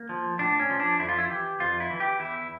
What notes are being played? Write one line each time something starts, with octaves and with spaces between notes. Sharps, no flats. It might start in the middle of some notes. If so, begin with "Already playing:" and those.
Already playing: A#3
F3
A2 D4
C#4
F3
D4
F2 E4
F4
E4
E3 G4
F2 F4
E4
E3
G4
E2 E4